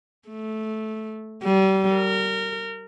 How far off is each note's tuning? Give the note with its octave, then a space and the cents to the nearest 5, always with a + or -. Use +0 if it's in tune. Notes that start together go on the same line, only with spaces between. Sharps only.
A3 -10
G3 -35
A#4 -25